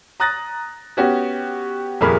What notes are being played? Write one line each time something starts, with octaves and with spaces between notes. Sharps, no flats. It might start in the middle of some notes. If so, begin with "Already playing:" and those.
A#5 D#6 F#6 A6 A#6
B3 C#4 F#4 G4
D#1 F2 G#4 A#4 B5